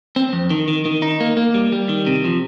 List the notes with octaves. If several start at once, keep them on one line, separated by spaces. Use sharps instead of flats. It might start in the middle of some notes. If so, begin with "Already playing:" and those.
C4
F2
D#3
D#3
D#3
D#4
A#3
A#3
G3
G3
D#3
C3
F3